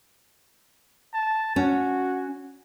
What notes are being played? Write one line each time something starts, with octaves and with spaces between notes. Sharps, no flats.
A5
C#4 F#4